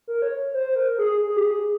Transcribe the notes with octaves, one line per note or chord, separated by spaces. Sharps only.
A#4
C#5
C5
A#4
G#4
G#4
G4
G#4